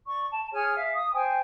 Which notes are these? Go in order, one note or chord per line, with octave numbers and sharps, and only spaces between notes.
D5 C#6
A5
G#4 C#5 G#5 F6
E5 F5
D#6
C5 G5 G#5